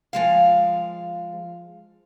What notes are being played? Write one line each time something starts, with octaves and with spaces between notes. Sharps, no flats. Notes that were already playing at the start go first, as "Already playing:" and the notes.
F3 G#3 F5